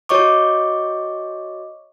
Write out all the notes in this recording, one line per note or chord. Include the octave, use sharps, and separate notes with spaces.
F#4 C#5 D#5 C#6 D6